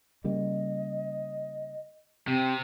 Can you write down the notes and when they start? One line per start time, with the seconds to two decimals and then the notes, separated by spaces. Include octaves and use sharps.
0.24 C#3 G3 A#3 D#5
2.28 C3 C4 G4